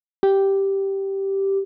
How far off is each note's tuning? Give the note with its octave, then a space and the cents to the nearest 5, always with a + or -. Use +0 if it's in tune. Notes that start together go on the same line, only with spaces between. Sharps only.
G4 -5